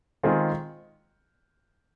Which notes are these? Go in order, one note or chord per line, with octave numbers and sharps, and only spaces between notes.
D#3 G#3 C4 F4 G#4